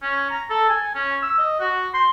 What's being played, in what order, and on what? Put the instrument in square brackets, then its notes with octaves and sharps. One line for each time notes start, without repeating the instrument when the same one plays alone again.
[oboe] C#4
A#5
A4
G#5
C#4
E6
D#5
F#4
C6